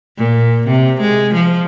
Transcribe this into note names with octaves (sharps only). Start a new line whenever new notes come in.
A#2
C3
G#3
F3